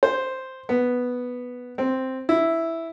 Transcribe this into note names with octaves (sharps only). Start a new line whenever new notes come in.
C5
B3
C4
E4